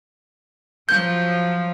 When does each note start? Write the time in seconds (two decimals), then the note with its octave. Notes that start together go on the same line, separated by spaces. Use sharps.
0.89 F3 F#3 G6